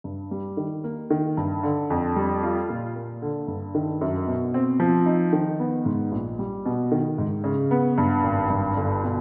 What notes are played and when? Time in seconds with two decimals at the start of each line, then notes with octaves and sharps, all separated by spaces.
0.04 G2
0.31 G3
0.57 D#3
0.84 A#3
1.10 D#3
1.37 G2
1.63 D3
1.90 F2
2.16 G3
2.43 F4
2.69 A#2
2.96 A#3
3.22 D3
3.48 G2
3.75 D#3
4.01 F#2
4.27 B2
4.54 C4
4.80 F3
5.06 D#4
5.33 D#3
5.60 B3
5.85 G#2
6.12 A#1
6.39 G3
6.66 B2
6.92 D#3
7.18 G#2
7.44 C#3
7.71 B3
7.98 G2
8.24 G#1
8.50 G2
8.77 G1
9.03 B2